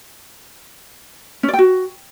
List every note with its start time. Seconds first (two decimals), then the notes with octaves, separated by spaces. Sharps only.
1.43 C#4
1.48 D5
1.53 G5
1.59 F#4